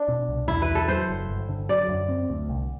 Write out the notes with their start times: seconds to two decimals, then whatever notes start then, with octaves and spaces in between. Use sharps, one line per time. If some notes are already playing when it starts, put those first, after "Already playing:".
Already playing: D4
0.08 B2
0.28 C2
0.48 E2 E4
0.62 B4
0.69 E3
0.75 A4
0.88 F#3 C5
1.09 F#1
1.29 G1
1.49 D3
1.69 F#3 D5
1.89 F#2
2.09 C4
2.30 D2
2.49 C2